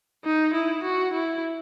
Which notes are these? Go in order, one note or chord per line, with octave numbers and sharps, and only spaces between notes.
D#4
E4
F#4
E4